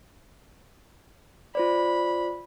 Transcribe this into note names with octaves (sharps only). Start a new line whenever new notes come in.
F4 C5 D5 B5